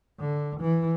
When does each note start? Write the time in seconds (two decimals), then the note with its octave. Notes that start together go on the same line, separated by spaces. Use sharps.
0.20 D3
0.60 E3